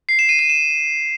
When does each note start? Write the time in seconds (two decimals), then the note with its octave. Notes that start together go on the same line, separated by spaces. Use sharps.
0.09 C7
0.19 E7
0.29 D#7
0.39 D#7
0.49 E7